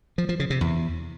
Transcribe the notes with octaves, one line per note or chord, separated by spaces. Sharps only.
F3
F3
C#3
C3
E2